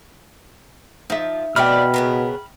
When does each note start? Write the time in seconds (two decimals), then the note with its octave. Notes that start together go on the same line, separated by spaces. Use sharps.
1.10 F3 D#4 E5
1.56 B2 A3 C4 D4 E5 G5 B5 F6
1.94 C#3 B3 A#4